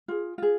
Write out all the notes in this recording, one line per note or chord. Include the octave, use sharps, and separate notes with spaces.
F4 G#4
F4 G#4